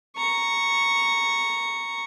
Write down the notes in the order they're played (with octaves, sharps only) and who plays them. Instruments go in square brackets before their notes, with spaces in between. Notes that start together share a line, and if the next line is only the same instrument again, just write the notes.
[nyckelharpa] A#5 C#6